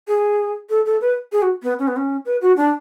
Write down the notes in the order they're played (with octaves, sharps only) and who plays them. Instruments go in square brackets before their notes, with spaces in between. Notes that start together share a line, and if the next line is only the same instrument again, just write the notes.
[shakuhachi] G#4
A4
A4
B4
G#4
F#4
B3
C#4
B3
C#4
B4
F#4
D4